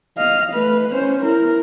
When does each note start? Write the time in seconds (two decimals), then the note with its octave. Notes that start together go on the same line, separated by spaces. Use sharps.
0.17 D#5 F5
0.52 A3 B4
0.93 C#4 C5
1.23 E4 A#4